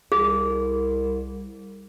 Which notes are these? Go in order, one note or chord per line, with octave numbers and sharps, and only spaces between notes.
C2 G#4